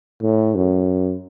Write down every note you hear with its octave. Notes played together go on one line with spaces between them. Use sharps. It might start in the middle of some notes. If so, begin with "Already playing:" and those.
A2
F#2